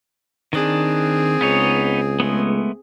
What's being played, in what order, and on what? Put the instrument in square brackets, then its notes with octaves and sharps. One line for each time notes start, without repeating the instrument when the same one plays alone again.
[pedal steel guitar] D#3 D4 [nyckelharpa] C4 G#4
[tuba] C#2 [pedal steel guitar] B3 D#4 C#5
[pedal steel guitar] G#3 A3 B3